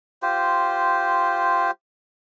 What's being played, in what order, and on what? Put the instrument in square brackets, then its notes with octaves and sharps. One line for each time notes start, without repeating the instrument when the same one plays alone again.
[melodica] F4 G4 C5